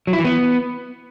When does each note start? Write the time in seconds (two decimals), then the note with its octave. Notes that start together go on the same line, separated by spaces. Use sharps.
0.07 F#3
0.13 E4
0.19 E3
0.24 B3